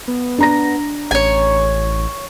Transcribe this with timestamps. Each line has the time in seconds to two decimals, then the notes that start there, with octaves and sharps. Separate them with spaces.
0.08 B3
0.38 D4 A#5 A#6
1.11 A1 C#5 G#5